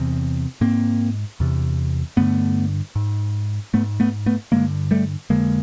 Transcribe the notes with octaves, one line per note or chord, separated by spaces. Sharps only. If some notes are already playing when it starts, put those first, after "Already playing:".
Already playing: E2 C3
G#2 A#3 C4
E2 C3
G2 D3 A3 B3
G#2
G#2 A3 B3
A3 B3
A3 B3
G2 D3 G#3 A#3
G3 A3
F2 D3 G#3 A#3